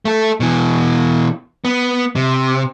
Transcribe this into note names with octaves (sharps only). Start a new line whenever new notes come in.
A3 A4
B2 E3
B3
C3